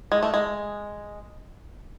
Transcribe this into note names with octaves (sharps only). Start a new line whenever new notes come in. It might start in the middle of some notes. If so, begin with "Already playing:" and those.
G#3
A3
G#3